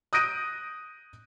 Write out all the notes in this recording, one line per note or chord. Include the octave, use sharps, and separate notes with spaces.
D#6 F#6 G6 A#6 D7 D#7